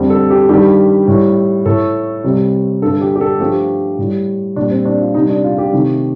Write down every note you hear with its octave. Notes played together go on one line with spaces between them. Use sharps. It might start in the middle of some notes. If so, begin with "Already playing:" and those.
Already playing: F2 D3 G3
A4
G4
G2 D#3 G3 G4
A2 G3
A2 A3 A4
C3 G3
G2 D3 G3 A4
G4
G4
A4
G2 F3 A3 G4
A2 G3
A#2 G3 D4
C4
D4
F4
C3 G3 D#4
D4
F4
G4
C3 D#3 A3